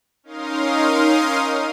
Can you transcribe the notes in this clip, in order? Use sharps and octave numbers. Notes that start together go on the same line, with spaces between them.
C#4 D#4 A#4 F5 C6 D#6